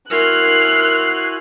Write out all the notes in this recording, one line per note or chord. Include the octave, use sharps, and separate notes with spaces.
E4 F#4 A#4 G#5 C6 F6 F#6